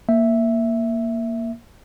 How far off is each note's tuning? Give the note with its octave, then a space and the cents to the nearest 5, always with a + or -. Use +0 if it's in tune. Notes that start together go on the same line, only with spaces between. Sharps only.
A#3 +0 E5 +0